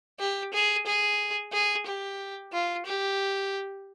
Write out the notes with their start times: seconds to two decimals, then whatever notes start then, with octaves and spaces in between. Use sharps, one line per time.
0.19 G4
0.53 G#4
0.86 G#4
1.52 G#4
1.86 G4
2.53 F4
2.86 G4